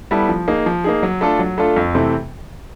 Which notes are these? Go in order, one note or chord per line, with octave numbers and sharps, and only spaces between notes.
G3 B3 E4 A4
F3
A#3 D#4 G#4
F3
A#3 D#4 G#4
F#3
A3 D4 F4 A4
F#3
A3 D4 F4 A4
F2
C3 E3 A3 C4